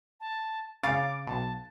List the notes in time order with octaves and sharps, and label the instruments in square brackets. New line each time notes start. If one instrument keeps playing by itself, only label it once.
[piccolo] A5
[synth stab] C#3 [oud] F5 [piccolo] D6 [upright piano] A6
[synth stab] B1 [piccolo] A5